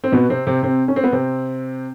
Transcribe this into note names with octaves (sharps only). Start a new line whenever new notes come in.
C4
B2 B3
C3 C4
C3 C4
C3 C4
C#4
C4
B3
C3 C4